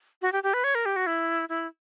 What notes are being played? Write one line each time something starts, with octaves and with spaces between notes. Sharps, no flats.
F#4
G4
G4
B4
C#5
A#4
G4
F#4
E4
E4